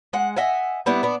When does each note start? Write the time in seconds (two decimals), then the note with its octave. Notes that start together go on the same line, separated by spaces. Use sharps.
0.13 G#3 F#5
0.36 D#5 E5 F#5 G#5
0.86 G3 B3 D4 E4
1.03 B3 D4